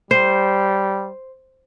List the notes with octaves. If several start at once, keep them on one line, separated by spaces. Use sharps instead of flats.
G3 C5